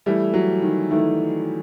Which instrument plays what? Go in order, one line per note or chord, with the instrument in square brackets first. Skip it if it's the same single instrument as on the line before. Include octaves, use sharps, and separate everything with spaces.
[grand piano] E3 A3 E4 A4 [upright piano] G3
[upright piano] F#3
D#3
[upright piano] D#3 [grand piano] E3 A3 E4 A4